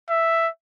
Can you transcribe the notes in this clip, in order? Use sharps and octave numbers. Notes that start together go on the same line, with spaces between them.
E5